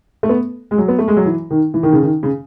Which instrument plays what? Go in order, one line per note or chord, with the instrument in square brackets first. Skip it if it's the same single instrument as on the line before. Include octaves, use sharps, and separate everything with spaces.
[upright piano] A3
B3
G#3
F#3
B3
A3
G#3
F#3
E3
D#3
E3
D#3
C#3
D#3
C#3